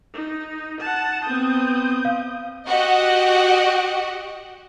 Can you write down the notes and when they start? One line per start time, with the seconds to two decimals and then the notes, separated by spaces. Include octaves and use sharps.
0.14 D#4
0.81 F#5 A5
1.25 B3 C4 D#6 G6
2.05 F5
2.67 F#4 G4 D#5 F#5